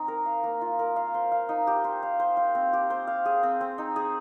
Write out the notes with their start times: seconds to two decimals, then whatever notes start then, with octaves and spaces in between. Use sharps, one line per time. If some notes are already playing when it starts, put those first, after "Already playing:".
Already playing: C4 D#4
0.08 A#4
0.26 F5
0.44 A#3
0.61 F4
0.79 A#4
0.96 F5
1.14 C5
1.32 F5
1.49 D#4
1.67 G4
1.84 C5
2.03 F5
2.20 C5
2.37 F5
2.55 C4
2.73 G4
2.90 C5
3.07 F5
3.25 G#4
3.43 C4
3.61 C4
3.78 D#4
3.96 G#4